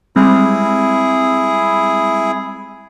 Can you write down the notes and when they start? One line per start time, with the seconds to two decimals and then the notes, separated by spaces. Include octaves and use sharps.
0.16 G3 G#3 C4 E4 G#4